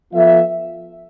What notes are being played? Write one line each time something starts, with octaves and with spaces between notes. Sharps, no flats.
F3 B3 F4 A4 E5